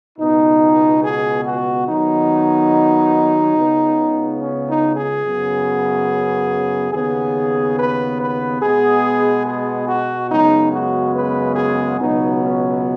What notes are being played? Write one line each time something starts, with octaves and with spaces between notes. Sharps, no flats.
C#2 B2 B3 D#4
G#4
F#4
D#2 D#3 F#3 B3 D#4
C#2 C#3 B3
C#4
D#4
G#4
F#2 C#3 B3
D#2 C#3 B3 G#4
B4
B4
B2 G#3 B3 G#4
G#4
F#4
F#2 C#3 G#3 B3 D#4
F#4
B4
G#4
C#2 B2 F#3 B3 D#4
C#4